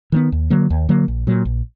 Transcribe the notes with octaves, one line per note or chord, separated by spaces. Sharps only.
D#3 G3 B3
D#2
D3 F#3 A#3
D#2
D3 F#3 A#3
A#1
A#2 F#3
A#1